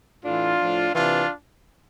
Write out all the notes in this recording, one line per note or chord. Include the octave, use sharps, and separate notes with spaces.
A2 E3 D4 F4
A2 F3
C3 E3 D4 F4